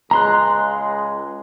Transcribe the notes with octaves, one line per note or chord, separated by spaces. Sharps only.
C#2 G#3 A#5 C6 F#6